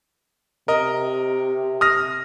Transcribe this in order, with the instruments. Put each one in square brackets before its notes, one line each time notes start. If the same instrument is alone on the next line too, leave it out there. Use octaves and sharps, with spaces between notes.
[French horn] C3 [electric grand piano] A#4 D#5
[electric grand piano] D#6 F6 A#6